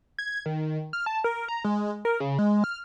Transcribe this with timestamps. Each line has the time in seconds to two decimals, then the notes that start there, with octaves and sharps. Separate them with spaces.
0.19 G#6
0.46 D#3
0.93 F6
1.06 A5
1.24 A#4
1.48 A#5
1.64 G#3
2.05 A#4
2.20 C#3
2.39 G#3
2.64 F6